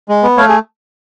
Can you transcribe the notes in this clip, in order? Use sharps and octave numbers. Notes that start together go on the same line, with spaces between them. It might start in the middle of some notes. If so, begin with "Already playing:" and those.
G#3
B3
A3 C#5 F5
G#4